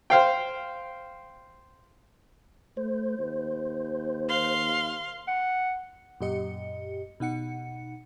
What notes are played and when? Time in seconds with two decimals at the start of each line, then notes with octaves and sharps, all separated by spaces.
0.10 C5 F5 G5
2.77 A3 C5
3.19 D#2
4.29 F5 C6
5.28 F#5
6.21 F#2 A#2 G4 D#5 C#7
7.20 B2 D#4 F#5 C#7